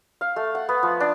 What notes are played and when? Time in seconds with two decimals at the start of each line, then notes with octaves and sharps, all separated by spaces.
0.21 F5
0.36 A3
0.55 F#5
0.69 B3
0.83 F3
1.00 D4